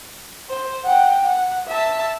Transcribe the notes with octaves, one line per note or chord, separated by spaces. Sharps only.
C5
F#5 G5
F#5
E5 A5